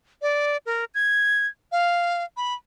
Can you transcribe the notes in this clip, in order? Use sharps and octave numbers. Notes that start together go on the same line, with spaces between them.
D5
A#4
G#6
F5
B5